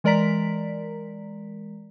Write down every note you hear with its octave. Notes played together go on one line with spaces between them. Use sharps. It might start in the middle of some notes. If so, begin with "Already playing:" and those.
E3 G#3 A#4 D5 A#5 B6